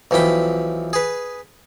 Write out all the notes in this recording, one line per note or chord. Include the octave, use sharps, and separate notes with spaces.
B1 E3 F3 G5 B5
G#4 B4